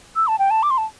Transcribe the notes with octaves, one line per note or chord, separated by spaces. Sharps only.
E6
A5
G5
A5
D6
C6
A5